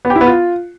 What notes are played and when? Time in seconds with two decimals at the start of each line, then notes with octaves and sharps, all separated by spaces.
0.05 B3
0.10 G4
0.16 E4
0.21 B3
0.26 F4